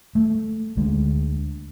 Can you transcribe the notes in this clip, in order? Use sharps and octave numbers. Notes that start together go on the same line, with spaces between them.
A3
D2 G#3